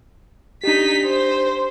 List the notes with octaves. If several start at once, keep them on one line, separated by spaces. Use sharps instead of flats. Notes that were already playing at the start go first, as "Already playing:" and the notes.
D4 D#4 G4 B6
C5